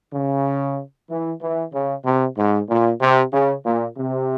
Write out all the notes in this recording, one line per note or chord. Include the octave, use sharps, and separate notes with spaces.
C#3
E3
E3
C#3
C3
G#2
A#2
C3
C#3
A#2
C3